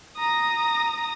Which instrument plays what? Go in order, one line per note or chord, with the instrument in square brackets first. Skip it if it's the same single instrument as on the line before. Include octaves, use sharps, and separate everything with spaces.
[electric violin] A#5 D#6